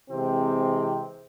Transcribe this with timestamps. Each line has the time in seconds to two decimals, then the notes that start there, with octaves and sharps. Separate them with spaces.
0.10 C3 E3 G#3 C4